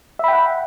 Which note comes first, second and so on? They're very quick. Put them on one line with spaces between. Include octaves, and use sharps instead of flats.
E5 B5 G5 F#5